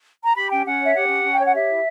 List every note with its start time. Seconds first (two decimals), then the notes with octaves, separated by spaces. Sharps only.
0.24 A#5
0.35 G4 B5
0.50 C#4 G5
0.64 C#4 F#5
0.80 C#5 E5
0.94 G4 F#5
1.09 C#4
1.23 C#4
1.33 G5
1.39 C#5
1.44 F#5
1.54 G4 E5
1.68 E4